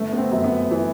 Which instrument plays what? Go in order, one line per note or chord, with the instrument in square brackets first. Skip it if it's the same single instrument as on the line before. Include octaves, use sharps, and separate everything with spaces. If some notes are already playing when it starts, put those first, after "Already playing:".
Already playing: [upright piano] G1 [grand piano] A3
[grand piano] B3
C4
[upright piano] F#2
[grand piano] B3
[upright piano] E3